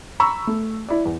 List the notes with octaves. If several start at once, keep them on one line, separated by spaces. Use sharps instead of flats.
A#5 B5 C#6 E6
A3
E4 D5
E2